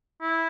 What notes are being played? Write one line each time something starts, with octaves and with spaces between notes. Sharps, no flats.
E4